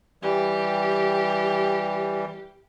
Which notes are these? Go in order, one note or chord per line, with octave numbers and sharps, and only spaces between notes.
E3 G3 G4